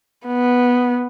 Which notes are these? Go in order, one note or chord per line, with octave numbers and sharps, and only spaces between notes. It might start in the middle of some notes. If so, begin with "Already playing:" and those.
B3